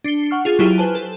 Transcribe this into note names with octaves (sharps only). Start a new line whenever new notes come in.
D4 C7 C#7 G7
F#5 C#6 F6
F4 G#4 A6
F#3 E4 G4 F6 F#6 D#7
B4 C5 G#5 A5
A4